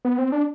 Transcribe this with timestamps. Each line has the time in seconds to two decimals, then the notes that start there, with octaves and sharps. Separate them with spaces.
0.05 B3
0.19 C4
0.32 D4